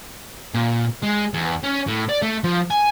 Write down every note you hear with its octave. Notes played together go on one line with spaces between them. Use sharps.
A#2
G#3
E2
C#4
A2
D5
A3
F3
G#5